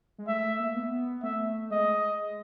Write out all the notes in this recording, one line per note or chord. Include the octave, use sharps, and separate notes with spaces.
G#3
A3 E5
A3
A#3
B3
A3 E5
G#3 D#5